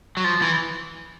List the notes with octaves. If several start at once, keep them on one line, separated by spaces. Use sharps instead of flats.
F#3
F3
E3